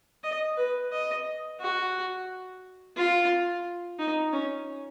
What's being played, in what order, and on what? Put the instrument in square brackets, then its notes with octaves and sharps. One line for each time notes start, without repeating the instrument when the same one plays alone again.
[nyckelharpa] D#5
B4
D#5
F#4
F4
D#4
C#4